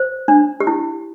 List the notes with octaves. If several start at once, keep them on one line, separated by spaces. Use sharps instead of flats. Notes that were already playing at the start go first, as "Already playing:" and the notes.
Already playing: C5
D4
G4
E4